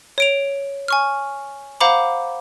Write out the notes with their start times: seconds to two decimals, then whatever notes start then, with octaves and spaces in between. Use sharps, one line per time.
0.18 C#5 D7 F7
0.88 G#5 C#6 F6
1.80 C5 F5 F#5 A#5 B5 D6